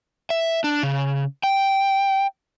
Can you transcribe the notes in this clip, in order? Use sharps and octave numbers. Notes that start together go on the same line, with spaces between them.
E5
D4
C#3
G5